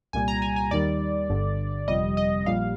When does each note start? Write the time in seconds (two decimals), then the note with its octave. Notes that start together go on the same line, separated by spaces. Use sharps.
0.13 C2 A#2 G3 G#5
0.28 A#5
0.42 G#5
0.56 G#5
0.71 D#2 D#3 G3 D5
1.29 G1 G2 D3
1.88 G1 F2 C3 G3 D#5
2.17 D#5
2.46 A#1 A#2 G3 F5